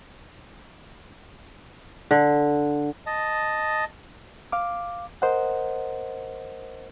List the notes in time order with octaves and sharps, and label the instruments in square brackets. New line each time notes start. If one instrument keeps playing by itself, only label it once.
[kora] D3
[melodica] D#5 A5
[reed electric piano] F5 D6
A#4 C5 D#5 F#5